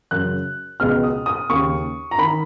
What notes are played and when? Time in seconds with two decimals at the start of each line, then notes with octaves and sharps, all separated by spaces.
0.11 F#2 C#3 F#6
0.80 C#2 B2 F6
1.03 D#6
1.26 D#6
1.49 D#2 C#3 C#6
2.11 A#5
2.18 D#3 B5